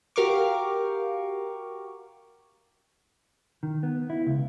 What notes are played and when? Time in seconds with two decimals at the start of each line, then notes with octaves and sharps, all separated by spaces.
0.16 F#4 G4 A#4 F5 C#6 D6
3.63 D#3
3.83 B3
4.10 E4
4.27 C#2